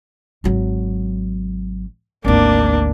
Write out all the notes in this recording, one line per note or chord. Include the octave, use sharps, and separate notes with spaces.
G#1 F#3
G#1 D2 A#3 D4